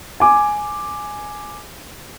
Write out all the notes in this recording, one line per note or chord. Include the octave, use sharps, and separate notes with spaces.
G#5 D6